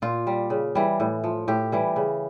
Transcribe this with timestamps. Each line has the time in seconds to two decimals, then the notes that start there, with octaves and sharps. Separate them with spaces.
0.02 A#2 F4
0.27 G3
0.50 C#3
0.75 E3 G3
1.00 A2
1.24 F3
1.48 A2 G4
1.72 E3 G3
1.96 C#3